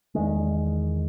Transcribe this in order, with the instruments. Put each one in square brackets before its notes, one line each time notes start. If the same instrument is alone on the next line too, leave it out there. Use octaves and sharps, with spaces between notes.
[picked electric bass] E2 D#3 G#3